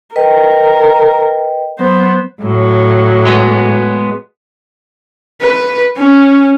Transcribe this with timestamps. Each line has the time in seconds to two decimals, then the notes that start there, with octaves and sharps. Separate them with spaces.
0.16 A#4 B4 D#5 G5
1.79 F#3 B3 C5
2.42 A2 F#3
3.27 G#3 B3
5.41 B4
5.97 C#4